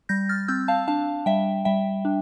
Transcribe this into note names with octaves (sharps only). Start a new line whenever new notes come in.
G3 G6 A#6
F6 A6
C4 E6 G6
F5 A5
D4 F5 A5
G3 E5 G5
G3 E5 G5
D4